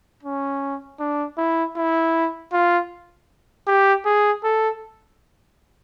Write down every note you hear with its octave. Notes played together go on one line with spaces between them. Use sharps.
C#4
D4
E4
E4
F4
G4
G#4
A4